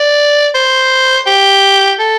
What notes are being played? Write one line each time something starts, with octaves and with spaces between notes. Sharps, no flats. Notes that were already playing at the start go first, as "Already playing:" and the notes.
Already playing: D5
C5
G4
A4